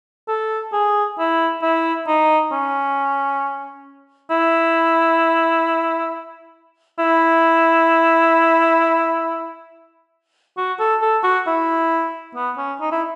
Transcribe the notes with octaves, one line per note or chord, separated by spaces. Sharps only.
A4
G#4
E4
E4
D#4
C#4
E4
E4
F#4
A4
A4
F#4
E4
B3
C#4
D#4
E4